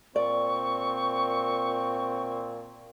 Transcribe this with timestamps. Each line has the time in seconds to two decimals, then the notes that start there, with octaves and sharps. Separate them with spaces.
0.16 A#2 C4 D5 C#6